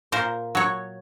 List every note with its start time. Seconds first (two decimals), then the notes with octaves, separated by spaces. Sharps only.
0.12 A#2 A#4 C5
0.55 F#3 C#5